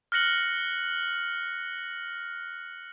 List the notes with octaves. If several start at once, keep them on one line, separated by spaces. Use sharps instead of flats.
F6 F#6 A#6 C#7 F#7